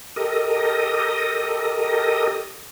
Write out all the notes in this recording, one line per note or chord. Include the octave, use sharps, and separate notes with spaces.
G4 A4 A#4 D#5 D#6